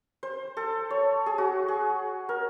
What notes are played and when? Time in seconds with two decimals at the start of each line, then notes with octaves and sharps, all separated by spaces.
0.23 C5
0.57 A4
0.90 C#5
1.26 G#4
1.38 F#4
1.68 G#4
2.29 A#4